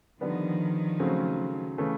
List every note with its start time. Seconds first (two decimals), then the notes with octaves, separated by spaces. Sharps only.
0.21 D3 D#3 F3 G3 B3
1.00 C#3 F#3 A3 C4
1.78 C#3 E3 A3